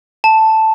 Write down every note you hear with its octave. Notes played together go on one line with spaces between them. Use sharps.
A5